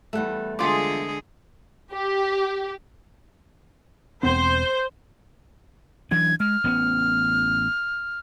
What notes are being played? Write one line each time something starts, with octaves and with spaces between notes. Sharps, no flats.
E2 G3 A3 A4 F#5
D3 G#3 F4 G#4 C6 D6
G4
E1 B3 C4 C5
E3 F#3 D4 G#6
G#3 F6
A1 B3 C#4